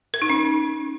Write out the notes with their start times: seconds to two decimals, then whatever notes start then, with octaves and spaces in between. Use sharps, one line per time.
0.14 A#4
0.22 D#4
0.30 C#4